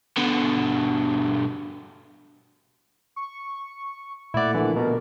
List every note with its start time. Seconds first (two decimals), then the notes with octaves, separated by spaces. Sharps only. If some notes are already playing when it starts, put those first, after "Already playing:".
0.17 B2 D3
3.16 C#6
4.34 A#2 A3 E4 D5 F#5
4.54 D3 E3 F3 A#3 A4
4.76 B2 A#4